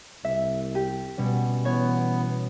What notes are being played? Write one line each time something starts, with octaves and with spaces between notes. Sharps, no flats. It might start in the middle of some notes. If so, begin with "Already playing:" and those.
C2 E5
G4
B2 G3 C#4
E3 B3 C#5